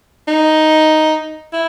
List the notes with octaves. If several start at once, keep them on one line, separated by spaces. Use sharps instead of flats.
D#4
E4